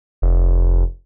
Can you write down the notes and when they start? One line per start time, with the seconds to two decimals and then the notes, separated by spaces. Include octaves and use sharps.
0.22 F1